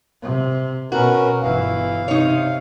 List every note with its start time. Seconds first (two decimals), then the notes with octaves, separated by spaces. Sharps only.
0.22 C3
0.92 B2 C#4 F#4 A#4 B4
1.42 G1 E3 F5
2.08 C3 D#4 C#5